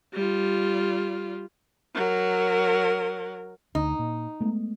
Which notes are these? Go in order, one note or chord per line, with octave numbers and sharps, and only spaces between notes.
G3 F4
F#3 A#4
D2 D#4
A#2
G#3 A3 B3